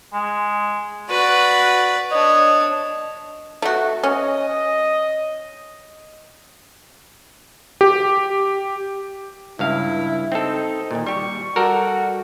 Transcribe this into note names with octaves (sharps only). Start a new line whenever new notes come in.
G#3
F#4 B4 D5
D4 C#5 D#5
A3 F#4
C#4 D#5
G4
C#2 G2 E4 F5
C4 D#4 A4
A#2 D#3
G3 G4 C#6
G3 F#4 A4 A#4